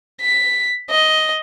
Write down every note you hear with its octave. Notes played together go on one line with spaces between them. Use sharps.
B6
D#5